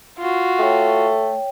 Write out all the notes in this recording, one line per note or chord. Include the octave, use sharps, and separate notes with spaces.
F4 F#4
A3 C#5 G5